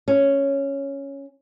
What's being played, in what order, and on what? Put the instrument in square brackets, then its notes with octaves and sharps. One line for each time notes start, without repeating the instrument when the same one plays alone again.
[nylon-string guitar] C#4